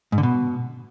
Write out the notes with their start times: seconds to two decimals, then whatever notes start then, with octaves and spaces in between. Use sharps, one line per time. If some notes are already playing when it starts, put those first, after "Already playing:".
0.12 G#2
0.18 D3
0.23 B2